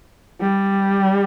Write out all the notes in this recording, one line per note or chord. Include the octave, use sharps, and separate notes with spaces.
G3